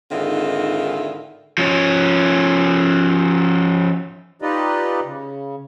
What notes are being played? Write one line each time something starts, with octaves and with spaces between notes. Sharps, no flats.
G#2 D3 D#3 C4 E4 F4
F3 C#4
D#4 F4 G4 B4 D5 D#5
C#3